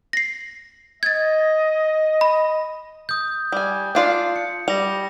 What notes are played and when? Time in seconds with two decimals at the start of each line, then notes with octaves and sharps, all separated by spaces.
0.13 A#6 C7
1.03 D#5 G#6 A6
2.21 B5
3.09 D#6 G6
3.52 G3 G#5
3.95 D4 F4 D5
4.36 C#7
4.68 G3 A#6 F7